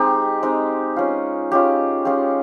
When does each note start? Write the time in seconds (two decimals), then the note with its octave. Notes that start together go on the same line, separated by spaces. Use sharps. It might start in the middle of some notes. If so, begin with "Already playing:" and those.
Already playing: G#3 C4 D#4 G4
0.43 G#3 C4 D#4
0.96 G#3 C#4 F4
1.51 G#3 C#4 F4 G4
2.05 G#3 C#4 F4 G4